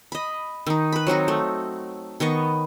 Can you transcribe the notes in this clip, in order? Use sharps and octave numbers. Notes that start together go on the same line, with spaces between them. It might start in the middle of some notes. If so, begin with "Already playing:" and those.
D#5 B5
D#3 D#4
B4 B5
F#3 C4 D#4 F#4
A3
D#3 B3 D#5 C#6